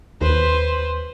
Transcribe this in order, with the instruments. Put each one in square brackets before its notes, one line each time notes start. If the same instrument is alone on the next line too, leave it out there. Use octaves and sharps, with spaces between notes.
[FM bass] D#2 [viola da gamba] B4 C5